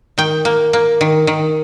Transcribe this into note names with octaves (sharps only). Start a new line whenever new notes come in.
D#3 G5
A#3
A#3
D#3
D#3